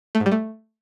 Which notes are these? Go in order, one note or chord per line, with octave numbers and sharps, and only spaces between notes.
A3
G#2
G3
A3